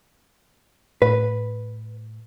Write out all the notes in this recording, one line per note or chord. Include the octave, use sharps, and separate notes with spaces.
A2 B4